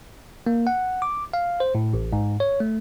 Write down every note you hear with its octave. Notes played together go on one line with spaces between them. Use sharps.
A#3
F#5
D6
F5
C5
A2
A1
G#2
C#5
A3